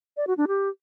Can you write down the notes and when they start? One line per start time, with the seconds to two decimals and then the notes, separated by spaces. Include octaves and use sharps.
0.17 D5
0.27 F#4
0.37 D4
0.48 G4